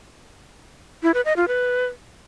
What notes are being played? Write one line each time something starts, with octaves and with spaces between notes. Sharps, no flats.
E4
B4
D#5
F4
B4